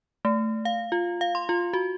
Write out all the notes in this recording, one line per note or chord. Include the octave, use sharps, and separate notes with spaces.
A3
F5
F4
F5
C6
F4
F#4